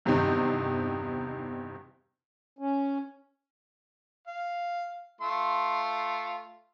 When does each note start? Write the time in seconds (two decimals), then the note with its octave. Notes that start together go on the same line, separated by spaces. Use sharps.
0.05 E2 G2 C3 D#3 C4 D#4
2.59 C#4
4.27 F5
5.21 A3 F4 C6